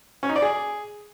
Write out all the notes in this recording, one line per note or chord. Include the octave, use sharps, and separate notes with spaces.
C#4
D#4
D5
G#4